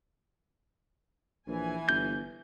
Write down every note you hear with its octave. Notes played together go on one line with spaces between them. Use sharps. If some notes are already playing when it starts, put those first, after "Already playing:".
A#1 E3 G#5
G1 G6